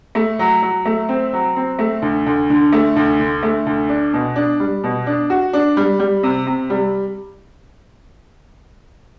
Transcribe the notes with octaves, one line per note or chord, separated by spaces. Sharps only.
A3
F#3
F#3
A3
C4
F#3
C4
A3
D2
D2
D3
A3
D2
D3
A3
D2
D4
B2
D4
G3
B2
D4
F#4
D4
G3
G3
C3
C3
G3